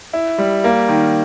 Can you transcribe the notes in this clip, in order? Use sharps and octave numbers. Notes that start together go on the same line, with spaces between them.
E4
G3
A#3
D#3